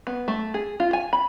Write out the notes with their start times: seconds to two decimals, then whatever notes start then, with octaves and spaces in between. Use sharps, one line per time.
0.07 B3
0.28 A3
0.54 G#4
0.80 F4
0.93 G#5
1.13 B5